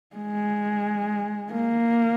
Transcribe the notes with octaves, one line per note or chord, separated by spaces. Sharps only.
G#3
A#3